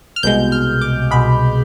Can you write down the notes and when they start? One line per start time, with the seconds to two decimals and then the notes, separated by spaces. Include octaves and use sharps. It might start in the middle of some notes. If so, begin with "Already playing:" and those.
0.16 F6
0.23 C2 B2 G#3 G6
0.52 F6
0.81 D6
1.11 C2 B2 G#3 B5